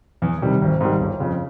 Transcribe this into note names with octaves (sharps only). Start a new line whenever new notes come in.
E2
C3 D#3 G3
G#1
G#2 D#3 G3
G1
F2 C#3